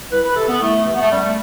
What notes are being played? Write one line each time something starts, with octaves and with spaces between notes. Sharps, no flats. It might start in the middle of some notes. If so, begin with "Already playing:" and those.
C2 B4
B4
C3 E3 A4
B3
C2 A3
C3 E3 A3
B3
A3
F#2 G3
A3